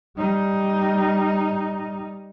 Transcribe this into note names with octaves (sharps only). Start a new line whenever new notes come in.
G3 D#4